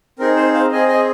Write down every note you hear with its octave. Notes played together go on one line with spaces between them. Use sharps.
C4 D#4 G#4 A#4
C5
C5 F5
C4 G#4 D#5 G#5
D#5 G#5